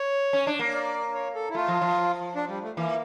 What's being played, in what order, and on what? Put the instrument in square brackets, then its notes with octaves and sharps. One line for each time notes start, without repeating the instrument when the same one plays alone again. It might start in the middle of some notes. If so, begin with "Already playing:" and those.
Already playing: [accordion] C#5
[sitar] C#4
D4
A#3
[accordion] D5
C#5
A4
E4
[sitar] A3 [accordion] F4
[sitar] F3
F3
[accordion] D4
G3
A3
[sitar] E3 [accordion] A#3